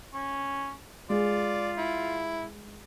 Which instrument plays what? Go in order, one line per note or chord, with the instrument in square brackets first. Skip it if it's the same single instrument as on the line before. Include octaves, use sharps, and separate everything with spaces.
[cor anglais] C#4
[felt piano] G#3 [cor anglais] F4 [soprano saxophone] D5
[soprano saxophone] E4